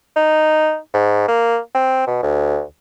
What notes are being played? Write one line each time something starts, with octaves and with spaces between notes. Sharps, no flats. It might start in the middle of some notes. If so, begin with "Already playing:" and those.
D#4
G#2
A#3
C4
B2
D2